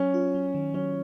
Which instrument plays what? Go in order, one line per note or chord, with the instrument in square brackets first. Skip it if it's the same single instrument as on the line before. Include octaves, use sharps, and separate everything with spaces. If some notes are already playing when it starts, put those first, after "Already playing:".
Already playing: [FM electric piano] F#3 [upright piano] C#4
[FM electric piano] F4
F#3
D#3
[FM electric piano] F#3 [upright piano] C#4